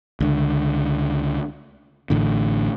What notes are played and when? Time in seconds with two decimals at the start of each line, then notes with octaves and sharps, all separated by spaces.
0.20 C#2 D3
2.10 A1 A2 D3